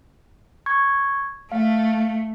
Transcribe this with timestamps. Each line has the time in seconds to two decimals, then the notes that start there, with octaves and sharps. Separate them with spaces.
0.66 C#6 G#6
1.52 A3 F5